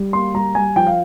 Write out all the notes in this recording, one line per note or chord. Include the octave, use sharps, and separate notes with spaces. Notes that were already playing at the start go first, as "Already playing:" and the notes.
Already playing: G3
A#3 C6
G3 A#5
G3 G#5
F3 G5
F5